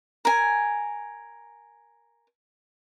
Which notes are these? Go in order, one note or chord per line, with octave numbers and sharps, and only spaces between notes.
A#4 G#5